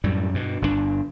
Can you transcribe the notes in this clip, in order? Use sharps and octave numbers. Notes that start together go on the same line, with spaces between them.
F#2 A2 G3
G2 B2
G1 G2 B2 D4